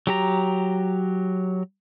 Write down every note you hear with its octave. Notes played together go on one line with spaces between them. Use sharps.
F#3 G4 A#5